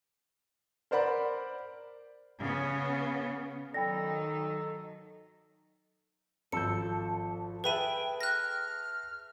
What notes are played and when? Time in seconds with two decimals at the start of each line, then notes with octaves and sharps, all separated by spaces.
0.91 A#4 C5 D5 F#5 B5
2.40 C#3 B3
3.74 D#3 F#3 D#4 A4 D5 G5 B5 A#6
4.57 D#5
6.52 G#1 F3 A4 G6 C#7
7.64 G#4 B4 E5 G5 A5 B5 D#7
8.21 F6 F#6 A#6